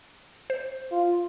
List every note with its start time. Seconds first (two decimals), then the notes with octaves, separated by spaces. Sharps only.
0.50 C5
0.92 F4